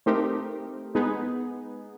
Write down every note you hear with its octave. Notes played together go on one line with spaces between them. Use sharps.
A3 C4 D#4 G4 A#4
G#3 B3 D#4 G#4